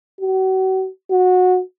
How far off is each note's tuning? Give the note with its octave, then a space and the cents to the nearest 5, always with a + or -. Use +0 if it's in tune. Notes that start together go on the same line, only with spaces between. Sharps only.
F#4 +40
F#4 -15